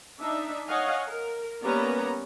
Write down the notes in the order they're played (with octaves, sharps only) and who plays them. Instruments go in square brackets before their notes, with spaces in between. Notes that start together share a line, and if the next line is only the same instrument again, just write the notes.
[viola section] D4 D#4 E5
C#5 D#5 F5 F#5 G#5
A#4
G3 A#3 B3 C#4 B4 A#5